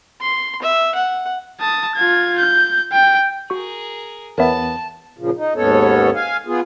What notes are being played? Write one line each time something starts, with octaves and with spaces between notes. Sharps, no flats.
C6
E5
F#5
A5 D#6
F4 G#6
G6
G5
F#4 G#4 A#4 C#6
E2 B3 A#4 C#5 E5 A5
A#2 C#3 F3
D#4
D#2 G#2 B3 C#4 A4 C#5
F5 G#5
B3 F4 G#4